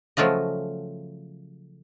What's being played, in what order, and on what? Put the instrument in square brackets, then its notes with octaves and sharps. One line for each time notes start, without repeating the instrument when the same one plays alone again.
[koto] C#3 F3 F#3 A3 F4 D#5